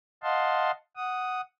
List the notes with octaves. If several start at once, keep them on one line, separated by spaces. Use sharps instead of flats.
D#5 F5 F#5 A5 C6
F#5 D#6